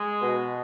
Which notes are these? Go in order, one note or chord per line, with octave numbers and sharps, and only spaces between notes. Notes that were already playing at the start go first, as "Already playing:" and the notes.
Already playing: G#3
B2